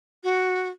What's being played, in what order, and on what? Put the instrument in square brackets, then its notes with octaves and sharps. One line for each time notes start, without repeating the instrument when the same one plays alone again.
[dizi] F#4